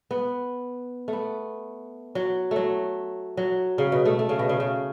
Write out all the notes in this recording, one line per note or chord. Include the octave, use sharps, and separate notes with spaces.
B3
A3
B3
F#3
F#3 A3
F#3
C#3
B2
A3
A3
C#3
B2
C#3
C#3